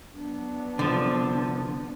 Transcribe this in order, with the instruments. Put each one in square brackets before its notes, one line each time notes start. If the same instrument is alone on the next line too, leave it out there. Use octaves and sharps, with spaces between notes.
[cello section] F#3 B3 [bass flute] D4
[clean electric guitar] C2 F3 [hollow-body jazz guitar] D3